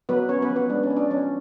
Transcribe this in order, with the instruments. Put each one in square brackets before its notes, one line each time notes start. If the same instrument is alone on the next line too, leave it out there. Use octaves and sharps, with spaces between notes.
[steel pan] F#3 B3 B4
C#4 C#5
B3 B4
F3
B3 B4
G#3 D4
C#4
B3
D4
F3 C#4